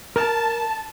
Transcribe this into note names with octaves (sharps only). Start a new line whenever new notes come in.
A#4 A5